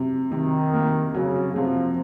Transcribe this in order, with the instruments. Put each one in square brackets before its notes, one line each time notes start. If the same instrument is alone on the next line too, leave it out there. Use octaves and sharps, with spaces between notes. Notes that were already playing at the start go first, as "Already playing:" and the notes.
Already playing: [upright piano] C3
[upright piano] C3 [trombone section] D#3
[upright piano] A#3
[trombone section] C#3 [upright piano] F#3
[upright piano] C3 [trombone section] F3